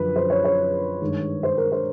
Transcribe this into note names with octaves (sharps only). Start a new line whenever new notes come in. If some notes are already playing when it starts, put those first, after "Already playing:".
Already playing: F#2 D3 F3 B4
C5
C#5
C#5
G2 D#3 G#3
C5
A#4
C5